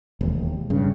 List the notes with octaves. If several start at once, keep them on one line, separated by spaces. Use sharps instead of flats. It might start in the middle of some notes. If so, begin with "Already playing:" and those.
E1 D#2
G2 C#3